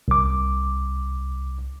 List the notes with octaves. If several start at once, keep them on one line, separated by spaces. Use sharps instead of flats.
C2 D6